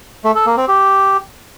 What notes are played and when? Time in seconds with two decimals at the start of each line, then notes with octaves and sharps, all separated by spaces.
0.24 A3
0.35 A4
0.46 A#3
0.57 C4
0.68 G4